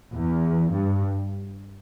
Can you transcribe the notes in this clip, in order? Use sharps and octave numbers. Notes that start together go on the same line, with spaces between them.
E2
G2